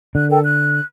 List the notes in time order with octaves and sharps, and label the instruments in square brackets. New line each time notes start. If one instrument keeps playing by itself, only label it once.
[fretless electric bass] D3 [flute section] F#6
[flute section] A4 A#4 G5
F#6